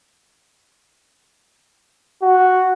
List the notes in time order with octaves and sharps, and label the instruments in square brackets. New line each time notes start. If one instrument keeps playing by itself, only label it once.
[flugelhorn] F#4